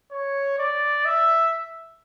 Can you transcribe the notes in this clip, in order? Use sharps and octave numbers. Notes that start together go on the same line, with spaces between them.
C#5
D5
E5